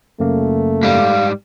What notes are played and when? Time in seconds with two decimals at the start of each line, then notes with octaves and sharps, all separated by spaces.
0.20 F#2 C#3 A3 A#3
0.83 G#2 G3 F5